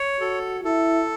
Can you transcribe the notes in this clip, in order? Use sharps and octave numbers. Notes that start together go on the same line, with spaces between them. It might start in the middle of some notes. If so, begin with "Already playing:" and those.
Already playing: C#5
F#4 A4
E4 A4